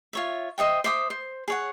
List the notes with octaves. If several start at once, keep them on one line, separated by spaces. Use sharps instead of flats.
F4 C#5 E5
C5 D#5 E5 G5
C5 E5 D6 D#6
C5
G#4 C#5 F#5